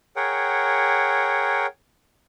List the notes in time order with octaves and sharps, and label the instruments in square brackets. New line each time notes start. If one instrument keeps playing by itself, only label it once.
[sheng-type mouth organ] G#4 A#4 C#5 F#5 G5